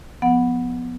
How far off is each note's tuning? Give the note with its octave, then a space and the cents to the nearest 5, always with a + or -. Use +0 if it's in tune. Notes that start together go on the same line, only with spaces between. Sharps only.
F3 +10 B3 +0 F#5 -10